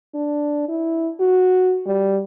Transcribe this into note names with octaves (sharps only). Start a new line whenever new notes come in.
D4
E4
F#4
G3